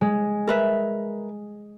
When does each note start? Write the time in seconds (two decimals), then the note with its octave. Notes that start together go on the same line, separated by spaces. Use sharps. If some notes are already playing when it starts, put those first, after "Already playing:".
0.01 G#3
0.47 A#4 B4 E5